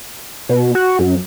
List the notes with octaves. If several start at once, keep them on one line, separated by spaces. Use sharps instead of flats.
B2
F#4
F#2